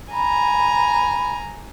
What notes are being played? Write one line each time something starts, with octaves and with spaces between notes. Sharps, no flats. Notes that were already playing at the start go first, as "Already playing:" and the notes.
G#5 A#5 B5